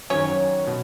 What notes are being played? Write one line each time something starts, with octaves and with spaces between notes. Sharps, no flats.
F#2 D#3 F#3 C#4 C#5
B2